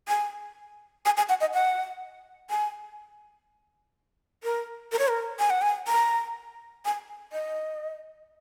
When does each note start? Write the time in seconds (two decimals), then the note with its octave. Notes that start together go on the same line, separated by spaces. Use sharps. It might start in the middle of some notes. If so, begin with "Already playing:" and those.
0.08 G#5
1.05 G#5
1.17 G#5
1.29 F#5
1.41 D#5
1.54 F#5
2.50 G#5
4.44 A#4
4.92 A#4
4.99 C#5
5.08 A#4
5.39 G#5
5.50 F#5
5.62 G#5
5.88 A#5
6.85 G#5
7.33 D#5